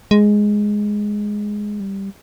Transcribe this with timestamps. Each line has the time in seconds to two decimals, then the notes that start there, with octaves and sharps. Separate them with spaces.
0.11 G#3
1.80 G3